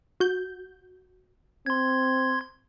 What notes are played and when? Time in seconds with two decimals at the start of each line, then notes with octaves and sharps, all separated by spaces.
0.20 F#4 G6
1.66 C4 C6 G#6